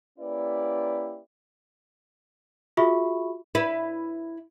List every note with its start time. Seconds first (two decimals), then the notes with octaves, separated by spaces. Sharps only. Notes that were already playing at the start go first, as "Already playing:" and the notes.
0.19 A#3 C#4 E4 G4 B4 D5
2.77 F4 F#4 G#4 E5 B5 C#6
3.55 E4 B4